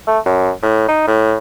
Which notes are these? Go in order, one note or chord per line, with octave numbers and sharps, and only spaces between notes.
A3
F#2
A2
D#4
A2